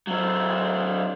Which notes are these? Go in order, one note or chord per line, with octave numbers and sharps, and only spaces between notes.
F#3 C4